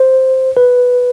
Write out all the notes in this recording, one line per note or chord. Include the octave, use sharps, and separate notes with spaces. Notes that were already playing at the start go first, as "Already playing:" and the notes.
Already playing: C5
B4